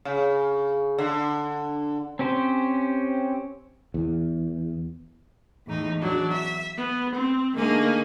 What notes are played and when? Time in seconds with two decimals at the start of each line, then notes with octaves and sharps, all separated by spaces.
0.05 C#3
0.98 D3
2.19 C4 C#4 G4 C5
3.94 E2
5.66 E2 A2 D#4
6.01 E2 F#3 D4
6.32 E5
6.77 B3
7.14 C4
7.54 D3 A3 A#3 D#4 G#4